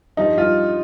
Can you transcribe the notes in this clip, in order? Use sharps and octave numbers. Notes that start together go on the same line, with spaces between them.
G2 F3 D#4
F4